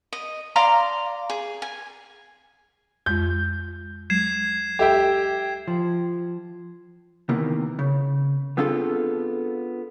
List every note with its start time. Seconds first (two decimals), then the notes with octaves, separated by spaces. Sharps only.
0.13 D#5
0.56 D5 F5 A#5 C6
1.30 G#4
1.62 G#5
3.06 F2 G#3 F4 G6
4.10 F#3 G#3 G#6 C7 E7
4.79 G4 A4 E5 G5
5.68 F3
7.29 C3 D#3 E3 A#3 B3
7.79 C#3
8.57 B3 C4 D4 F4 G#4 A4